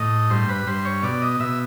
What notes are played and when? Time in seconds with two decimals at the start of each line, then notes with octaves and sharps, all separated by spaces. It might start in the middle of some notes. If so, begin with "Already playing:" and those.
Already playing: A2 D#5
0.30 G2 C5
0.49 B4
0.66 G2 C5
0.85 C#5
1.03 B2 D5
1.22 D#5
1.40 B2 E5